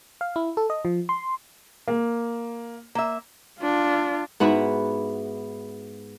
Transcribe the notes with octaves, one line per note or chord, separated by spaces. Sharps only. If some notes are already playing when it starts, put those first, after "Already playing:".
F5
E4
A4
D#5
F3
C6
A#3
A#3 E5
D4 F4
G#2 B3 E4 F#4